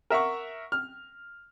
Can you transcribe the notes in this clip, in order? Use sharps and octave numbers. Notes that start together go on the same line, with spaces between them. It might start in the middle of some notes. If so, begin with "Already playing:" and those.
A#4 E5 F#5 C#6
F6